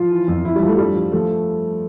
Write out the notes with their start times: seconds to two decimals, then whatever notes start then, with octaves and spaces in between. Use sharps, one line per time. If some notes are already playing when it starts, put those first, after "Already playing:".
Already playing: F3 F4
0.11 E3
0.28 F2
0.44 F2 E4
0.55 G3
0.62 F3
0.68 A3
0.78 G2 G3
0.95 F3
1.12 F3 A3